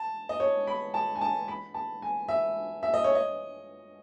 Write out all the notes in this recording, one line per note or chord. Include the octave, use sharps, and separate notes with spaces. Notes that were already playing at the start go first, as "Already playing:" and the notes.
Already playing: A5
D#5
C#5
B5
A5
G#5
A5
B5
A5
G#5
E5
E5
D#5
C#5
D#5